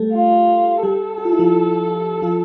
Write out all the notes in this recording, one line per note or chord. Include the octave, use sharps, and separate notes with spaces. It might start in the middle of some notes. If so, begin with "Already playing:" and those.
Already playing: G3 A3 G4 A4
F4
G3 G4 A4
G4
F4
E4
F3 F4
F3 F4